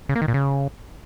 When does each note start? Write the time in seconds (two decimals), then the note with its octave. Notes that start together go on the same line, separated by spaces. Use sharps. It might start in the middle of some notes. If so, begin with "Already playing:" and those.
0.09 C#3
0.15 A#3
0.22 D#3
0.28 A#2
0.34 C#3